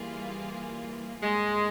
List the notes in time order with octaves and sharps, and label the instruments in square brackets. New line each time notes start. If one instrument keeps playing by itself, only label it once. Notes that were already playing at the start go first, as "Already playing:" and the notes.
Already playing: [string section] E3 G3 A#3 F4 G#4
[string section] G#2 G3 A#3 [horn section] G#3